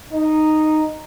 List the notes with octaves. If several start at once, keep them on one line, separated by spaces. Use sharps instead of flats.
D#4